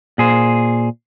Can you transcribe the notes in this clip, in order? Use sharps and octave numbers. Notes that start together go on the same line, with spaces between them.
A#2 G#4 C5